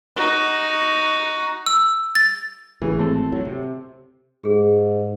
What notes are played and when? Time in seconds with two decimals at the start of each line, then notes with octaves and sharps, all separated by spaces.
0.16 D#4 F#4
1.66 E6
2.15 A6
2.82 G#1 A2 C#3 E3
2.98 A3 C4 A4
3.32 A2 F#3
3.45 C3
4.44 G#2 G4 G#4